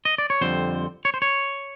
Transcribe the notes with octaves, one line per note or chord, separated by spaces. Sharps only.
D#5
D5
C#5
F2 D3 G3 C4 C5
C#5
C5
C#5